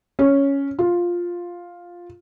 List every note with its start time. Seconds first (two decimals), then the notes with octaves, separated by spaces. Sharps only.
0.19 C#4
0.79 F4